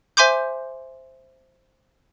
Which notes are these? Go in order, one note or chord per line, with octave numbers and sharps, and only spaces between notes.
C5 E5 G#5 C6 D6 G6